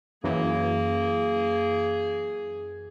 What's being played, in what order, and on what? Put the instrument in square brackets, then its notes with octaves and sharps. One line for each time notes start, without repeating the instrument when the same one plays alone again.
[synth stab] F#2 E3 [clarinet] A#3 [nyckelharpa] G#4